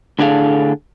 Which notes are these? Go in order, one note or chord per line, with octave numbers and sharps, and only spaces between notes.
A2 D3 D4 G#4 A4 F5